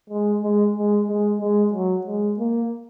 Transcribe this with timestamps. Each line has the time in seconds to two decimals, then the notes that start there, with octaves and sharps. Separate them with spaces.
0.10 G#3
0.43 G#3
0.76 G#3
1.08 G#3
1.41 G#3
1.73 F#3
2.06 G#3
2.39 A#3